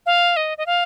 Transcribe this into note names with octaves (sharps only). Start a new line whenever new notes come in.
F5
D#5
D#5
F5